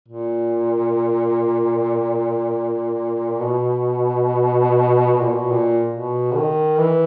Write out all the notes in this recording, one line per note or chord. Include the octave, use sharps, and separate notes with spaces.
A#2
B2
B2
A#2
B2
A#2
B2
D#3
E3